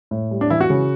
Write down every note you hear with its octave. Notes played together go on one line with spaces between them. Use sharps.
A2
G3
D4
E3 E4
F#4
C#3